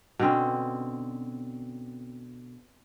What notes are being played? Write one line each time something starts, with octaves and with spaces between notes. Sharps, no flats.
B2 D3 C4 C#4